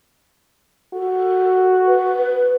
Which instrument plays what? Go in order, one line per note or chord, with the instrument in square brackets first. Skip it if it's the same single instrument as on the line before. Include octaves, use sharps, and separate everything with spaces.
[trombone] F#4 [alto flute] A4
[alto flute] B4